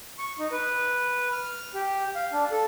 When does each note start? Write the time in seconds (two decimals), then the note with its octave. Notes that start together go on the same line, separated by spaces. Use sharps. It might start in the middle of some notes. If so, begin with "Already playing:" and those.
0.18 C#6
0.39 D#4
0.52 B4
1.32 F6
1.74 G4
2.15 F5
2.33 D4
2.51 A4